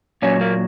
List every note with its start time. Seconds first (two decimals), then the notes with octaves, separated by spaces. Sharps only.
0.22 A#2 F#3 C#4
0.41 A#3